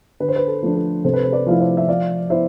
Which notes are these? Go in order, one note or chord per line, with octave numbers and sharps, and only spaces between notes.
D3 B4
C5
B4
A4
F3 A3 D4
A4
C3 A4 C5
B4
C5
B4 D5
F3 A3 E4 F5
C5 E5
E5
F3 D5 F5
B3 E4 C5 E5